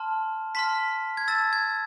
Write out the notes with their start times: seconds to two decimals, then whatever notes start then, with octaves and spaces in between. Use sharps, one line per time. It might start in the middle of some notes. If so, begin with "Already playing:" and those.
Already playing: A5 C6 F6
0.55 A5 C6 F6 B6
1.17 G#6
1.28 A5 E6 A6
1.53 G#6